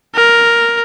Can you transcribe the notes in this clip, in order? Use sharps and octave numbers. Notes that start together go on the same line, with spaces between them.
A#4